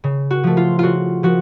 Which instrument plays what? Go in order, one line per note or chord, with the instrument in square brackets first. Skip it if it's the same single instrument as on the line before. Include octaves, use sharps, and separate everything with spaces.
[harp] C#3
F#4
F3 A3
F4
C#3 F4 F#4
F3 F#4